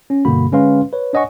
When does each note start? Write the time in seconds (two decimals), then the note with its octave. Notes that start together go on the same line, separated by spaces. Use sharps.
0.10 C#4
0.25 G2 B2 D3 A#3 F#4 B5
0.52 D3 G#3 C#4 B4 F5 C6
0.93 B4 C#5
1.13 D4 C#5 D#5 F#5 G#5 C#6